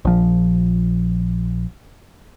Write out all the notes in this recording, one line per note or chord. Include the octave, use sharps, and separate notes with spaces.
A#1 F3